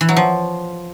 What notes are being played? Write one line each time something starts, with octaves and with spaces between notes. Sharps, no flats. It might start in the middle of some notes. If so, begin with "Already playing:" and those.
E3
F#3
F3